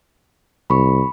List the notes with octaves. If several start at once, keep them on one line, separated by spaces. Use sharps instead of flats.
C2 B5 C#6